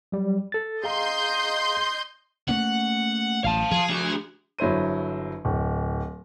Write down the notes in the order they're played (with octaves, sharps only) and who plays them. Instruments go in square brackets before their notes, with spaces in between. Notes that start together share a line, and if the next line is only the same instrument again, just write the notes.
[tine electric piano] F#3 G3
A4 A6
[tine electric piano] G#4 F5 A#5 [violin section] D#5 C6 G6
[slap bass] A3 A#3 C#4 [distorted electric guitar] F#5
[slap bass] A1 [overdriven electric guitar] F5 A5
[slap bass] F3 [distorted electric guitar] G#4
[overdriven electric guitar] D4 F#4
[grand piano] G1 F#3 E4 C5 D#7
D1